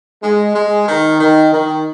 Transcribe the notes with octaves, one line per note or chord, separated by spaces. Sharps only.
G#3
G#3
D#3
D#3
D#3